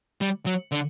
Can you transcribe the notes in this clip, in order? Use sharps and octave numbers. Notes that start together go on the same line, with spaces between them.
G3
F#3
D3